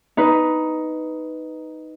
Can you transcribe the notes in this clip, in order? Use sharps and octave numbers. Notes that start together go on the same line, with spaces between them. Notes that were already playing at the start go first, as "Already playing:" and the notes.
D#4 B4